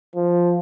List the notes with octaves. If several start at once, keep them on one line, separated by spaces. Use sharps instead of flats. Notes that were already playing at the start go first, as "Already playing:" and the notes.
F3